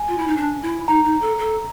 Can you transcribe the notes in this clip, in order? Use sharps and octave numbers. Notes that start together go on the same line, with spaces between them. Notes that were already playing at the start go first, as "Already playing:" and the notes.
Already playing: G#5
F4
E4
D#4
D4
E4
D#4 A#5
D#4
A4
A4